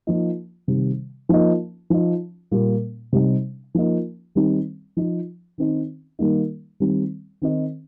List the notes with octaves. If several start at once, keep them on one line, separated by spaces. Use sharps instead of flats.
F3 A#3 D#4
C3 D#3 G3
F3 A#3 D#4
F3 D#4
A#2 G3 A#3
C3 G3 D#4
F3 A#3 D#4
D#3 G3 C4 D#4
F3 D#4
D#3 C4 D#4
D#3 G3 A#3 D#4
D#3 G3 C4
D#3 C4 D#4